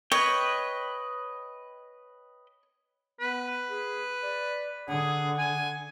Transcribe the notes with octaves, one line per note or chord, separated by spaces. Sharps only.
B4 C#5 D#5 G5
B3 B4
G#4
D5
D3 G#4 F#5
G#5